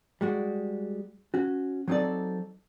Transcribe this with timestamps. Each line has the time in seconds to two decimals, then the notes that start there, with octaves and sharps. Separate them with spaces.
0.21 G3 G#3 F#4
1.34 C#4 F#4
1.88 F#3 C4 D#4 G4 A4 D5